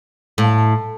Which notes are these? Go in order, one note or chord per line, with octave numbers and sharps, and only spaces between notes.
A2